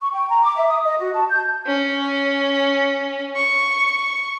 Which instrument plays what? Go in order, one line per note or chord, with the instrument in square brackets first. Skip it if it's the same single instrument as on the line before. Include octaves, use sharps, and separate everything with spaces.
[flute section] C#6
G5
A#5
D6
E5
D#6
D#5
F#4
A5
G6
[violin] C#4
C#6